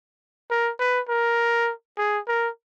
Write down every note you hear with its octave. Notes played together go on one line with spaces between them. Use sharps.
A#4
B4
A#4
G#4
A#4